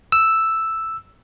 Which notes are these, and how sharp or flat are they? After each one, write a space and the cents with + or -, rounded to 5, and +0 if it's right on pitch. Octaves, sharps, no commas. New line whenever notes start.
E6 +0